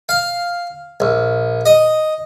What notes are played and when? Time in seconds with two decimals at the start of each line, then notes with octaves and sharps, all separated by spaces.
0.09 F5
1.00 A#1
1.66 D#5